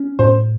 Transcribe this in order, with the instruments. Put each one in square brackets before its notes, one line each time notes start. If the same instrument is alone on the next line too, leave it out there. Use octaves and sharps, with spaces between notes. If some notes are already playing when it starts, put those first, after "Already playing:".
Already playing: [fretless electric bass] C#4
[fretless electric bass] A2 [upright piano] C5